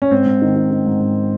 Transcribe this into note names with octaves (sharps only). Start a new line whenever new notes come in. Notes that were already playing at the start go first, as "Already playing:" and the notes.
C#4
G#2 C4
G#2
D#3
D#3
D#3
G#2
G#2